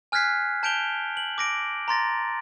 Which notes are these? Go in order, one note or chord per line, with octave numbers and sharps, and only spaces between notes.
G#5 F6 F#6 G#6 B6 C7
A5 G6 D7 F7 G7
F#7
D6 A#6 D7
A#5 C6 A6 A#6